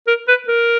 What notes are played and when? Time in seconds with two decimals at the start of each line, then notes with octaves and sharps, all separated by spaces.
0.07 A#4
0.28 B4
0.48 A#4